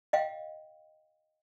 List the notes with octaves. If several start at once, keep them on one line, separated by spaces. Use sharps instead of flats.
D#5 F5 G5